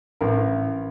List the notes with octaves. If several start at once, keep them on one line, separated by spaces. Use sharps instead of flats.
A1 A#4